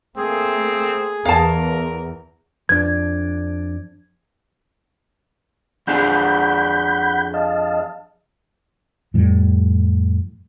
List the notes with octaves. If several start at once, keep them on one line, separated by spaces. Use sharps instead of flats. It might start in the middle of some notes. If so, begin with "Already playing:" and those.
A3 A#3 C4 G#4
E2 A#4 F5 A5
F2 D4 G#6
F2 D4 G#4 F#5 B5 G6
D#5 F5 A5
F2 A2 G3